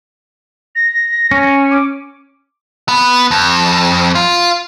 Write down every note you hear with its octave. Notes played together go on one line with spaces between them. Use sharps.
A#6
C#4
D6
B3
F2
F4